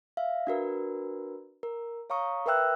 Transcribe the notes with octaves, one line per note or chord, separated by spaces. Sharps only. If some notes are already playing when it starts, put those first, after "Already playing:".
E5 F5
D4 F#4 A#4 B4
A#4
C#5 F5 A#5 C#6 D#6
A#4 B4 E5 G5 E6 F#6